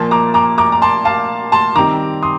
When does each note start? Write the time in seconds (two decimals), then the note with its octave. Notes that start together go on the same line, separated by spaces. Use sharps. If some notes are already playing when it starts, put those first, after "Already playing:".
Already playing: A#2 F3 A#3 A5 C6
0.11 A#5 D6
0.34 A#5 D6
0.58 A#5 D6
0.72 A#5
0.82 A5 C6
1.05 F5 A5
1.52 A5 C6
1.76 D#3 G3 C4 A#5 D6
2.22 C6 D#6